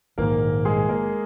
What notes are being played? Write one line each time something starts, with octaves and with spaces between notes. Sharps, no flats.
A#1 G#2 D#3 A#3 A#4
G#3 G#4
A#3 A#4